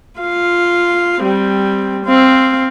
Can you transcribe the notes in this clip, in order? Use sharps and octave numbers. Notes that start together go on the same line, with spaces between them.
F4 F5
G3 C4
C4 F5